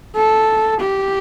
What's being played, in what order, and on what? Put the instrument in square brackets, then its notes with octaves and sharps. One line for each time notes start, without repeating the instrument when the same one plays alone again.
[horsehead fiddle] A4
G4